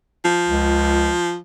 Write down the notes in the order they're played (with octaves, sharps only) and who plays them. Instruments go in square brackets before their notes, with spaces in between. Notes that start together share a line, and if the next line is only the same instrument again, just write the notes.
[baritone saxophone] F3
[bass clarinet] C#2